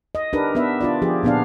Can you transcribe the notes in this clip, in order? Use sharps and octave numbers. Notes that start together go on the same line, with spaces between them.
D#5
D4 D#4 G4 A#4 B4
B3 D4 B4 E5
D4 F4 D5
F3 G4 G#4
A#2 B3 D4 F5